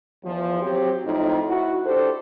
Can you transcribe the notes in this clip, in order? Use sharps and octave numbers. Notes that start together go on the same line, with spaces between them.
E2 F3
F#3 C4 G4
F2 A2 D#4
E4 F#4
D4 G4 A4 C5